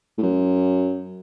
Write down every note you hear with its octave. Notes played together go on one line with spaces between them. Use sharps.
A2
F#2